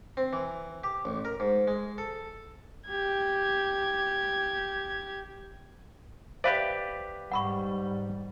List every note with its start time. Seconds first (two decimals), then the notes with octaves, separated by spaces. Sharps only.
0.17 C4
0.33 E3
0.84 G4
1.05 A1
1.25 A#4
1.40 G#2
1.68 G#3
1.98 A4
2.87 G4 G#6
6.44 G4 B4 C5 D5 E5 F5
7.31 G#2 G3 F#5 B5 C#6